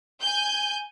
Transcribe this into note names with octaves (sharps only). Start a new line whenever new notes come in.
G#5 G6